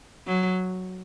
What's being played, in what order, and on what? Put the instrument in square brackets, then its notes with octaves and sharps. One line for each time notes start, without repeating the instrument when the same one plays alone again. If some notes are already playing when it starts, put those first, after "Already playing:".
[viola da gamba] F#3